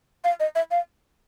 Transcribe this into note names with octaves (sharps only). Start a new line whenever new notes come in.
F5
D#5
E5
F5